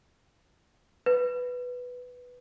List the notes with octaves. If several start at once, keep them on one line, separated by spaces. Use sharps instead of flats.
B4